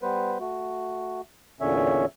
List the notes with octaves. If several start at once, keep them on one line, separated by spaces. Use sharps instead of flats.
G3 B3 B4 C5
A3 F#4
E2 A#2 D3 C#4 C#5 E5